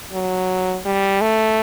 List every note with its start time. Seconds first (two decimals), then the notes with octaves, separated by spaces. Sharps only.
0.13 F#3
0.85 G3
1.22 A3